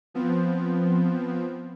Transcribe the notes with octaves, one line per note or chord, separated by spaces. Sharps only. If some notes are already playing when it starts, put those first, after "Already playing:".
F3 B3 C4